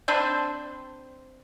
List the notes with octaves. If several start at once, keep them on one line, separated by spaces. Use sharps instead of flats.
C4 D4 B4 C5